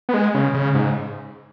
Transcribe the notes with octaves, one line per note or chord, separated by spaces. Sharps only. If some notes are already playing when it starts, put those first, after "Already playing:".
B3
G#3
C#3
C#3
G#2